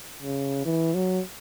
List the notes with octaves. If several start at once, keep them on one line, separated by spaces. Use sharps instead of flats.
C#3
E3
F#3